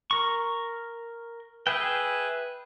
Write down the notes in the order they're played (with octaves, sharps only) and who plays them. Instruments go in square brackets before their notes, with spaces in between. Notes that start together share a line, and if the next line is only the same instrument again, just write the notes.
[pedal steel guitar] A#4 C#6
[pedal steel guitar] G#4 E5 G5 [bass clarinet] B4